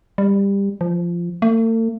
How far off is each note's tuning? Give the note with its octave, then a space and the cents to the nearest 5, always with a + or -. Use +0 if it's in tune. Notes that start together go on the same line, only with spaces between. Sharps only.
G3 +20
F3 -15
A3 +45